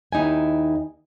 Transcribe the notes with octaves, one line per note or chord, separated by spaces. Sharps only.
D#2 D#4 E4 G#5